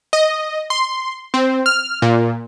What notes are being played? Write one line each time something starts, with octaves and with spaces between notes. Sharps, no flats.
D#5
C6
C4
F6
A#2